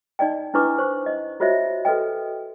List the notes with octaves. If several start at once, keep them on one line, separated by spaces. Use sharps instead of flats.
D#4 D5 D#5 G5
D4 E4 B4 C#6 D6
C5 C#6
D#5
F4 F#4 C5 C#5 D#5 E5
F#4 A4 B4 D#5 G5